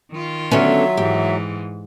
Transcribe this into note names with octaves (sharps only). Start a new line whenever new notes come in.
D#3 F4
D3 F#3 B3 C#4 E5
G#2 E3 G4